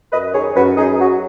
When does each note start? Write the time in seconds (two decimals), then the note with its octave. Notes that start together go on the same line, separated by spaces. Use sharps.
0.12 F#2 B4 D#5
0.34 D#3 G#4 C#5
0.56 F#2 F#4 B4
0.77 F#2 D#4 G#4
1.00 F#3 F#4